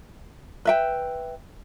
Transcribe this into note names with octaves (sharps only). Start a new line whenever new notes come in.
B4 E5 G5